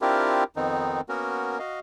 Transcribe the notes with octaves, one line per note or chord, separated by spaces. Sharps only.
C4 D4 E4 F4 G4 A#4
F2 D#3 B3 C4 D#4
A#3 B3 C#4 F#4 A#4
F#4 D#5 F5